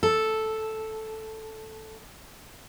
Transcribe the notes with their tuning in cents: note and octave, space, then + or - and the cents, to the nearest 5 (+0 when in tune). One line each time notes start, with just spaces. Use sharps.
A4 -5